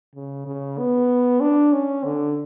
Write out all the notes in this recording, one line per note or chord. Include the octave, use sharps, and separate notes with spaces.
C#3
C#3
B3
D4
C#4
D3